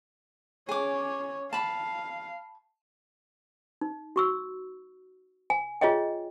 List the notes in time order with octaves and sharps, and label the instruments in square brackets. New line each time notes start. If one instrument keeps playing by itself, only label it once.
[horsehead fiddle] C#4 C#5 [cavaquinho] G#4 D6
[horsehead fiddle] F5 [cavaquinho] A5 B5
[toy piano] D#4
F#4 C#6 E6
G#5
F4 G#4 C#5 D#5 G5